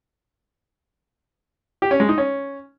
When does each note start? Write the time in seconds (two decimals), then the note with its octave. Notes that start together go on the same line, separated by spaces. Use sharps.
1.82 G4
1.91 C#4
2.00 G#3
2.09 D#4
2.18 C#4